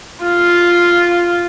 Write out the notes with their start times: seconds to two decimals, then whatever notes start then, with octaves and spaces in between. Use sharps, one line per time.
0.24 F4